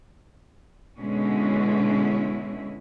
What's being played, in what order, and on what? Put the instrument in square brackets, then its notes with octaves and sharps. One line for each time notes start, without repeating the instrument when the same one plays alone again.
[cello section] B2 D3 G#3 C#4 E4